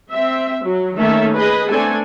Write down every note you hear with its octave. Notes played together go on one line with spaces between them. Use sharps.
C4 E5
F#3
D#3 A3 A#3 C#4 A4 E5
G#4 B4 D#5
A3 B3 C4 D4 A4 G#5